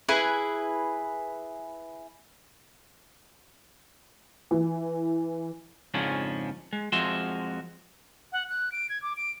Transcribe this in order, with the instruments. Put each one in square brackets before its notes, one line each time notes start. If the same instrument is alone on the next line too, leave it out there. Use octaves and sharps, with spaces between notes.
[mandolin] E4 G#4 B4
[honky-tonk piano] E3
[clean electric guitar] F2 G#2 C#3 F3 C#4 D4
G#3
F2 F3 G#3 F#4 E5 C6
[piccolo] F#5
F#6
D7
G#6
D6
D7